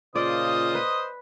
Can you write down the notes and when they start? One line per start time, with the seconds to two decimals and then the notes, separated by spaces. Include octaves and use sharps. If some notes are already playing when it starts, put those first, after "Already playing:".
0.15 A#2 C#3 F4 C5 D5 D#5 D#6
0.75 B4